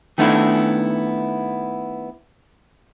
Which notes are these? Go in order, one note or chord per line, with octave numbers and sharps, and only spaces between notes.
D#3 A3 B3 D4 E4